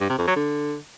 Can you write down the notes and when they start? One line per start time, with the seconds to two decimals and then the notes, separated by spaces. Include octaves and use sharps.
0.01 G2
0.10 C3
0.18 F2
0.27 F#3
0.36 D3